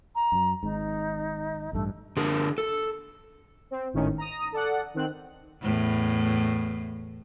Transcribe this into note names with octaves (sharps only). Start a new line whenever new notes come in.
A#5
F#2 F#3
G#1 G#2 D#4
A1 G2 A3
D3 G#4 A#4
A4
C4
G#1 A2 D#3 C#4
A#5 D#6
A4 D5 F#5
D#3 C4 F#6
E2 A2